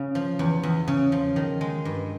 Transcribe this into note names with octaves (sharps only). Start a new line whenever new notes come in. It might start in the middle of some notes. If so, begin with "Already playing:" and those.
Already playing: C#3
F3
E2
E2
C#3
F3
D#3
G#3
G2